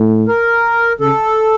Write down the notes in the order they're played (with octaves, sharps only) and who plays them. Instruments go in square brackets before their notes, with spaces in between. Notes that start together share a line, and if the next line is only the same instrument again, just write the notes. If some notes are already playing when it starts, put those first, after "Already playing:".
Already playing: [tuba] A2
[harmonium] A#4
[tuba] C#3 [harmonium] A4